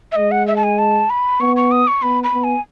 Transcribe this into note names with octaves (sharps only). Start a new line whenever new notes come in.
E5
G#3 D#5
F#5
E5
A5
G#5
A5
B5
B3 C#6
C#6
D#6
C#6
B3 B5
B5
B3
G#5